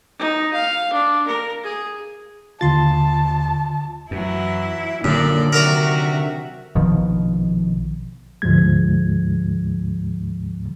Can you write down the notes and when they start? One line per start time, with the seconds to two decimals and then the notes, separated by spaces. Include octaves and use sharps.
0.19 D#4
0.54 F5
0.93 D4
1.27 A#4
1.63 G#4
2.61 D#2 D3 F4 A5 C6 A6
4.11 F#2 E3 F#3 E4
5.04 F#2 A#2 D3 D#3 A#3 D4 A4 D5
5.53 C3 F#3 F#4 A#4 D5 E5 A#5
6.75 A#1 B2 D#3 F3
8.42 D2 G#2 F3 G#3 G#6